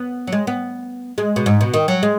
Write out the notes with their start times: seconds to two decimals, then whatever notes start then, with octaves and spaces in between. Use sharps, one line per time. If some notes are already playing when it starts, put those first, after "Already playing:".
Already playing: B3
0.27 F#3
0.32 G#3
0.47 B3
1.18 G#3
1.36 B2
1.46 G#2
1.61 B2
1.74 D#3
1.88 F#3
2.03 G#3